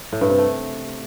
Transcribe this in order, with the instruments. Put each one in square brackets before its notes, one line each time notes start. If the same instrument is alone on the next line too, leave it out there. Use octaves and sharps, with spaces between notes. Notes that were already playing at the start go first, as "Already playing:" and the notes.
[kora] A2
G2
C3
A3